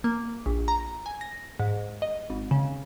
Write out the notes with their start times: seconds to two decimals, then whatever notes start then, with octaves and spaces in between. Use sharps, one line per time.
0.04 A#3
0.46 A#1
0.68 A#5
1.06 G#5
1.21 A#6
1.60 G#2
2.02 D#5
2.30 G#1
2.51 C#3